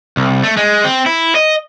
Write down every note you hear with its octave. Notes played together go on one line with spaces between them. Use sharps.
C2
A3
G#3
C4
E4
D#5